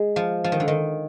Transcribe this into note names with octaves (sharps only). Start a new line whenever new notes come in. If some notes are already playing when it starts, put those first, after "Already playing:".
Already playing: G#3
F3
F3
D#3
D3
D#3